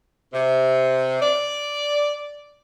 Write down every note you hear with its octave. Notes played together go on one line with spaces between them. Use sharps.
C3
D5